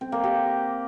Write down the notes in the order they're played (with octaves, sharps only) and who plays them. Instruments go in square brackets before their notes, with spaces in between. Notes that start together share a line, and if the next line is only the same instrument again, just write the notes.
[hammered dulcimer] C4
A#3
G4